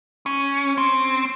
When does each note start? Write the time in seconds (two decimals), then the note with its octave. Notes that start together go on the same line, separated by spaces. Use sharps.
0.26 C#4
0.78 C4